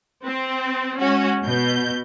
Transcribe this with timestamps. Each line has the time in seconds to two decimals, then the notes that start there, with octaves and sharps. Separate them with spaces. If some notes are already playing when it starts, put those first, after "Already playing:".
0.24 C4
0.99 G#3 C#4 F#4
1.44 B2 G6